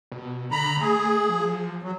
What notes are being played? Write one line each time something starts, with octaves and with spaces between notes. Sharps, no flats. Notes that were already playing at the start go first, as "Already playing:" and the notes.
B2
D3 A#5 B5
A3 G#4
F3
F#3